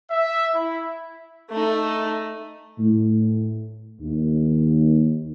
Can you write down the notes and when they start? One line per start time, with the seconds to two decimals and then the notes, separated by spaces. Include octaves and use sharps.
0.11 E5
0.53 E4
1.50 A3 D#4
2.79 A2
4.01 D#2